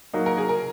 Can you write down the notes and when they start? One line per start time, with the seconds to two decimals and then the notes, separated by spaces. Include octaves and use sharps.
0.14 F#3 A#3 D#4
0.26 A#4
0.37 G#4
0.49 A#4